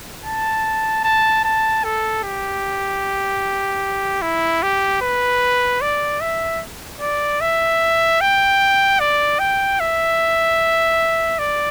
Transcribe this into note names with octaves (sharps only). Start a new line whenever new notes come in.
A5
A5
A5
A4
G4
E4
G4
B4
D5
E5
D5
E5
G5
D5
G5
E5
D5